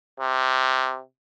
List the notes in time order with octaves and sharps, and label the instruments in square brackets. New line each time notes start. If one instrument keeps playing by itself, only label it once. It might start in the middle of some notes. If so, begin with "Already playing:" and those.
[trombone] C3